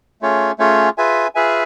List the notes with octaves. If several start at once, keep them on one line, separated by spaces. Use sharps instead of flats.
A3 C#4 F4 G#4 C#5
A3 C#4 F4 G#4 C#5
F4 G#4 B4 E5 G#5
F4 G#4 B4 E5 G#5